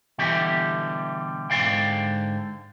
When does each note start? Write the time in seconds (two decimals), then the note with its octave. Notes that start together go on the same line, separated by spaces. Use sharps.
0.18 B2 D3 E3 G3 G4
1.50 G#2 D3 D5 F5 G5